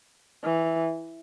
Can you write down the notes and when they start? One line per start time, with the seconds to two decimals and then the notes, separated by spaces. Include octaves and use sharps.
0.43 E3